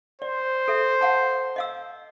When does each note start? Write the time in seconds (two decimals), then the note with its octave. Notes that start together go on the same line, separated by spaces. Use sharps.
0.22 C5 D5
0.68 A4 E5
1.01 F5 F#5 A5
1.56 D#5 F5 E6